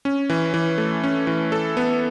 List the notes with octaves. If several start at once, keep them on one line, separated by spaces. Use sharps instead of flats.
C#4
E3
E3
A3
C#4
E3
A4
B3